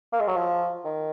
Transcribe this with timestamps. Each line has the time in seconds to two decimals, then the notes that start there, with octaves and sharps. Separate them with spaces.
0.13 A#3
0.20 G#3
0.28 F#3
0.36 F3
0.85 D#3